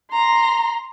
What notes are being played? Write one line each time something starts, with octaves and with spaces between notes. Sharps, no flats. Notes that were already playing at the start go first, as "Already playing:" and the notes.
A#5 C6